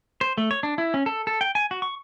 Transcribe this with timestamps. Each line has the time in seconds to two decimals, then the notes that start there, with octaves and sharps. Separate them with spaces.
0.21 C5
0.38 A3
0.51 C#5
0.63 D4
0.78 E4
0.94 C#4
1.06 A4
1.27 A4
1.41 G5
1.55 G#5
1.71 F#4
1.82 C#6